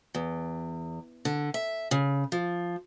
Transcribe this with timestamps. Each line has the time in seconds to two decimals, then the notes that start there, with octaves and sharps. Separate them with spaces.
0.15 E2
1.25 D3
1.54 E5
1.91 C#3
2.32 F3